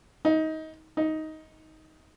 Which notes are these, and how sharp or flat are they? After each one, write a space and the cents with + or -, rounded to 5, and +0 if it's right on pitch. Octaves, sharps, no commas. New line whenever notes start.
D#4 +20
D#4 +10